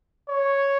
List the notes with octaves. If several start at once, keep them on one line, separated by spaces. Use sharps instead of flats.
C#5